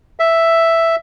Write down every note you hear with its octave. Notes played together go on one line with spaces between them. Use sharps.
E5